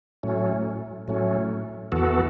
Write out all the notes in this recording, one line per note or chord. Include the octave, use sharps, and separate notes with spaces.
A2 F#3 A3 C#4
A2 F#3 A3 C#4
E2 E3 B3 F#4 A4